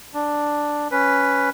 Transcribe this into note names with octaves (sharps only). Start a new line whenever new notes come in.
D4
C#4 B4